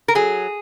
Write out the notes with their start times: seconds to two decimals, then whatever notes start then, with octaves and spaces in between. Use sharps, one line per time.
0.08 A#4
0.15 F#3 G#4